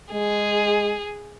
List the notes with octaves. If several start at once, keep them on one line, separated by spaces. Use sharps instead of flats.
G#3 G#4